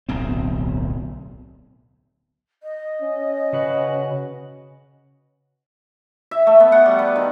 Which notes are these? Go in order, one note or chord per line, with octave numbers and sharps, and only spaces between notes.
D1 B1 C4
D#5
C#4
C#3 F#4 B4
E5
A3
B3
F#5
G3
B4
D#3